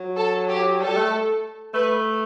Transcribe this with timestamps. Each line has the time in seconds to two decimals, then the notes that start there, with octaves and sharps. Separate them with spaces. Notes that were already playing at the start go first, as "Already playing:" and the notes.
Already playing: F#3
0.17 A4
0.49 G4
0.80 G3 A4
0.96 A3
1.73 A3 B4